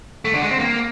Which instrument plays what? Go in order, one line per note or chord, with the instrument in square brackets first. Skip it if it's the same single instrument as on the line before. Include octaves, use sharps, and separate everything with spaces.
[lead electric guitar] A3
D3
G#3
C4
A#3